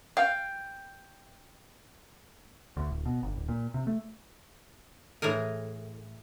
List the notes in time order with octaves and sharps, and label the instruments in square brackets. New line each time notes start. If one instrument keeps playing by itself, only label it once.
[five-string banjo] F5 [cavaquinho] G5
[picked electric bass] D2
D1
B2
G1
D1
A#2
C3
A3
[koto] A2 E3 G#4 A#4